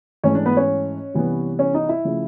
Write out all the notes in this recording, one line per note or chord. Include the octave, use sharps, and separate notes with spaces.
G#2 E3 A3 C#4 C#5
D4 D5
B3 B4
C#4 C#5
C3 E3 G3 B3
C#4 C#5
D#4 D#5
E4 E5
C#3 F3 A3